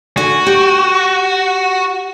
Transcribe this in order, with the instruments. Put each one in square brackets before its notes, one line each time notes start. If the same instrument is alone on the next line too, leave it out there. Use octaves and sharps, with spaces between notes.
[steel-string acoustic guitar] D3 G#5 [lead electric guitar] F#4
[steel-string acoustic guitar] G4